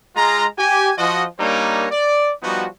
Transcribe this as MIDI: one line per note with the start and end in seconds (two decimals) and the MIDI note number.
0.16 0.46 56
0.16 0.46 65
0.16 0.46 82
0.58 0.91 67
0.58 0.91 80
0.98 1.24 53
0.98 1.24 66
0.98 1.24 75
1.39 1.87 55
1.39 1.87 58
1.39 1.87 62
1.39 1.87 63
1.39 1.87 70
1.39 1.87 73
1.91 2.31 74
2.43 2.66 53
2.43 2.66 55
2.43 2.66 59
2.43 2.66 63
2.43 2.66 66